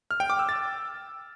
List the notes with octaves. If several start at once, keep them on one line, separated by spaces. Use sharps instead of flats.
F6
G5
D6
E6
A6